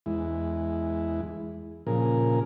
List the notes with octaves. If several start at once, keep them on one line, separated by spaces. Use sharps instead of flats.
E2 G#3 E4
A#2 C#3 F3 G#4 A#4